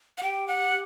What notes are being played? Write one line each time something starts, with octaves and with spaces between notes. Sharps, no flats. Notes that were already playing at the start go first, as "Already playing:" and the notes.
F#5
G4 G5
F#5